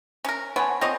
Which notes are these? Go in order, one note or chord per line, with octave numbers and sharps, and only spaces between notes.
C#4 A#4
B3 C#5 G#5 A5 C6
F#5
C4 F4 A4 C#5 D#5 C#6